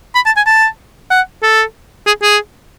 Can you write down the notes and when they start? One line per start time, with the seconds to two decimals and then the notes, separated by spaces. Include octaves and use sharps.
0.15 B5
0.26 A5
0.37 G#5
0.46 A5
1.11 F#5
1.43 A4
2.07 G#4
2.22 G#4